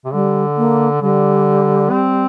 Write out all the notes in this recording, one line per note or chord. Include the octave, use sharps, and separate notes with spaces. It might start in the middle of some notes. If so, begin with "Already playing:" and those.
C3
D3 G3
A#3
D3 G3
C4